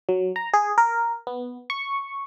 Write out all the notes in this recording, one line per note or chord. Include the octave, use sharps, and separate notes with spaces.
F#3
A#5
G#4
A#4
B3
C#6